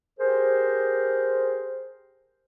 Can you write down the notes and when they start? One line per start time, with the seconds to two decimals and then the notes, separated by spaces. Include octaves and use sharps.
0.19 G4 G#4 A#4 C5